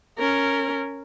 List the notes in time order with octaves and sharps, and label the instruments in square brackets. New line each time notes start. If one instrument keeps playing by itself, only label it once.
[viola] C#4 A#4